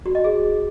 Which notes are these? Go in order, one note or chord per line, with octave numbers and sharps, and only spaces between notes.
F#4
D#5
G#4